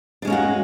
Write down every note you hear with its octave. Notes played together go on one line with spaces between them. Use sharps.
G#3 A#3 C#4 D4 F#4